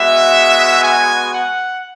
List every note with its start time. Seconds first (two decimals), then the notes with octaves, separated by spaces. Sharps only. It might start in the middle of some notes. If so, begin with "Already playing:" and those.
Already playing: G#3 B3 F#4 E5
0.83 G#5
1.33 F#5